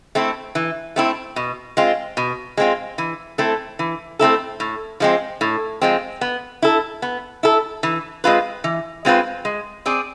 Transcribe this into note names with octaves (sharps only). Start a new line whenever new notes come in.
A3 C4 E4
E3
A3 C4 E4
B2
G#3 C4 F4
B2
G#3 C4 F4
E3
A3 C4 E4 A4
E3
A3 C4 E4 A4
A2
F3 G#3 C4
A2
F3 G#3 C4
B3
E4 A4
B3
E4 A4
E3
G#3 C4 F4 B4
E3
G#3 C4 F4 B4
G#3
C4 G#4 D5